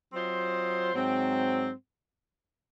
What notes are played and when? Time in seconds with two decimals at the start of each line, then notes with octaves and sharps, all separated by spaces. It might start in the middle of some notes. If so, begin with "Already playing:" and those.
0.12 F#3 C4 F4 C5 D#5
0.92 G#2 F#3 C4